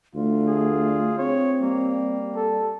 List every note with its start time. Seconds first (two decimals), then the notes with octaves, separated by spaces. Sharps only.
0.15 D2 A3 F4
0.47 G#4
1.18 C4 C#5
1.62 G3 A#3
2.36 A4